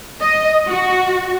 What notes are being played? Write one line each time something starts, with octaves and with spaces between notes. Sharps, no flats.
D#5
F#4